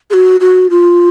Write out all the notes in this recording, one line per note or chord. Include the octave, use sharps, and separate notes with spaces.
G#4
F#4
F#4
F4